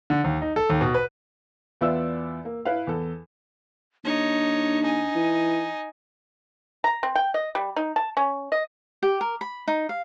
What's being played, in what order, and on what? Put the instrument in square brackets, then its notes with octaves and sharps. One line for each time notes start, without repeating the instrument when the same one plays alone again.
[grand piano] D3
D#2
D#4
A4
D#2
B2
B4
[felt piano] E2 B3 F4 D5 E5 E6
A#3
E4 B4 F5
E2 A4
[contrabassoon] D#2 [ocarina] D4 [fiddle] D#4 C#5
[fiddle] D#4 G#5
[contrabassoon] E3
[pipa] A#5
C4
G5
D#5
G3
D#4
A5
C#4
D#5
[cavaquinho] G4
A#4
B5
D#4
F5